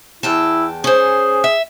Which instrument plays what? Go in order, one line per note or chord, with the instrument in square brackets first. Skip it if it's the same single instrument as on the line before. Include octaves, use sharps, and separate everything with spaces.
[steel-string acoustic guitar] E2 G5 A5 [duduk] E4
[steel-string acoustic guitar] C#4 C5 [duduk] G#4
[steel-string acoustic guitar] E5